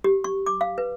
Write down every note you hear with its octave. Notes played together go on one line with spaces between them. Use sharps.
G4
C#6
D6
F5
B4